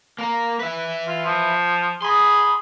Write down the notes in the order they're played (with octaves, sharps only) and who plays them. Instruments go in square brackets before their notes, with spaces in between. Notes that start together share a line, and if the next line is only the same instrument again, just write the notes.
[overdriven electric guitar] A#3 A#4
B4 E5
[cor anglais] F4
F3
[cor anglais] G#4 [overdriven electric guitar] B5 C6